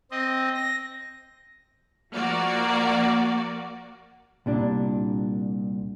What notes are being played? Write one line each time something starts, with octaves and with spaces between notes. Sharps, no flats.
C4 D#5
A#6
F3 A#3 F#4 D5
C2 A#2 D4